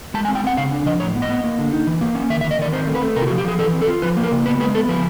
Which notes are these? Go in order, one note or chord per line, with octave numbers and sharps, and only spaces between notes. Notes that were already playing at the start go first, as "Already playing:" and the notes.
G#3 A5
G#5
C4
G5
C4 F#5
C#3 F5
D4
F3 D#5
A2 C#5
B3
D#5
B3
A#3
D3
D#4
E3
A#3
C#4
D#3 E5
E5
D#3
D#5
D#3 D5
C4 C5
A3
B4
A3
C3 A#4
F4
F#4
F3
G4
F3 G#4
E3 A4
C4
A4
F4
F3 B4
A#3
A#4
C#3
B3 B4
G#3 B4
B3 A4
F3 B4